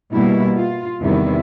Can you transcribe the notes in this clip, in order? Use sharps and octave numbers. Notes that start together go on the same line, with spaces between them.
B2 G3 A#3 E4
F4
E2 C3 D#3 G3 B3 E4